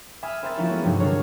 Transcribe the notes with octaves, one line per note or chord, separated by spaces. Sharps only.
E5 G#5 B5 D#6 F6
C4 A#4 C5 E5 B5 A6
F3 A#3 C#4 E4 F#4
G#3 A3 B3 C#4 F#4 A4
E2 G2 C3 F3 F#3 D#4
D3 D4 A#4 C#5